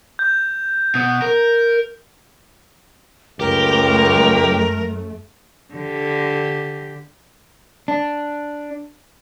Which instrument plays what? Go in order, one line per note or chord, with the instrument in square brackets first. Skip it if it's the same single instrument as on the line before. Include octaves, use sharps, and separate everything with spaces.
[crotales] G6
[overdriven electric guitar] B2
A#4
[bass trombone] C#2 [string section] F#2 A3 [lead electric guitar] G4 [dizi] A#4
[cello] D3 G4
[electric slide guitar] D4